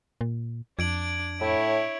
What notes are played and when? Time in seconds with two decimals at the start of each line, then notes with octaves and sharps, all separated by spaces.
0.21 A#2
0.79 F2 D4 G#6 D7 F#7
1.41 A2 E4 C#5